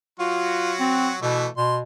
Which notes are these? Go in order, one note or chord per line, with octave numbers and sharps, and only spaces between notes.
F#3 F4 F#4
C4
B2 E3 A3
B2 C6